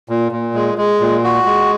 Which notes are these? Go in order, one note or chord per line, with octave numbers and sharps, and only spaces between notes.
A#2
A#2
G#3
G#3
A#2
F#4
G#3